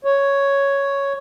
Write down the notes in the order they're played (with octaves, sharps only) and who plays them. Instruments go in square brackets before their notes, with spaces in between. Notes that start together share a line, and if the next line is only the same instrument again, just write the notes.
[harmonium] C#5